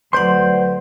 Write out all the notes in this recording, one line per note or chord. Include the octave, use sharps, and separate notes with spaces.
D2 F#3 B4 C5 D5 F#5 C6